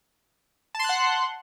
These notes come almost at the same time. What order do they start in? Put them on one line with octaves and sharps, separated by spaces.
A5 C6 F#6 F#5